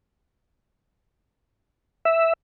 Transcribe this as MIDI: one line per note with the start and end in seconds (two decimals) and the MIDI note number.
2.05 2.33 76